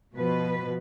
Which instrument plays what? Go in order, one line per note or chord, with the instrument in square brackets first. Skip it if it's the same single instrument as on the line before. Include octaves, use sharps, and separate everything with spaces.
[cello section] B2 F3 B4